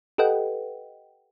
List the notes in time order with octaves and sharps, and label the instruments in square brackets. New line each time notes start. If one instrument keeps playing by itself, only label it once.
[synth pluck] G4 A4 B4 D#5 F#5 G5